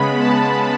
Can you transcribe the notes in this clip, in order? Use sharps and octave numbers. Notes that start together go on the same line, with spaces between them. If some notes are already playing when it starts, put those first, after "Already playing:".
Already playing: C#3 G#3 B3 B5
A5